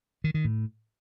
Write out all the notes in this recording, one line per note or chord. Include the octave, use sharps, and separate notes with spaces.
D#3
D#3
A2